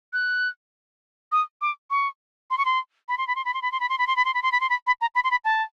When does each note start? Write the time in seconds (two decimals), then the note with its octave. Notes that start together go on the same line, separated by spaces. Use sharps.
0.13 F#6
1.32 D#6
1.61 D6
1.90 C#6
2.50 C6
2.58 C#6
2.65 C6
3.08 B5
3.18 C6
3.27 B5
3.36 C6
3.45 B5
3.54 C6
3.62 B5
3.72 C6
3.80 B5
3.89 C6
3.98 B5
4.07 C6
4.16 B5
4.25 C6
4.34 B5
4.42 C6
4.52 B5
4.60 C6
4.69 B5
4.87 B5
5.01 A#5
5.15 B5
5.24 C6
5.31 B5
5.45 A5